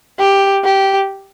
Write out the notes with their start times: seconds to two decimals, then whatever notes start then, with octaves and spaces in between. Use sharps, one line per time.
0.19 G4
0.64 G4